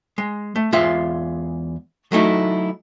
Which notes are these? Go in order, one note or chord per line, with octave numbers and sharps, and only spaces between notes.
G#3
A3
E2 G#3 F4 E5
F#3 A3 D#4 E4